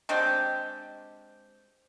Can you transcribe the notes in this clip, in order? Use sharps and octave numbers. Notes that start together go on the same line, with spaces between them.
G#3 C4 D4 G4